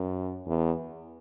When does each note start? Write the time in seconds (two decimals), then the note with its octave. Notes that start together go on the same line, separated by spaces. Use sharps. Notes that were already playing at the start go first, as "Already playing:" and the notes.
Already playing: F#2
0.46 E2